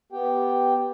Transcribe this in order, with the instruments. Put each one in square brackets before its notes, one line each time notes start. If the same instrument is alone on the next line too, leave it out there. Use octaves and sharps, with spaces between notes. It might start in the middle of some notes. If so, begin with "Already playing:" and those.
[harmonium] B3 G4 G5